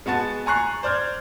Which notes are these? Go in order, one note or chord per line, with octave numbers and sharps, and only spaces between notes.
G#3 B3 F#4 A5 A6
G#5 A#5 C#6 F#6 C7
C5 D5 F6 G6 G#6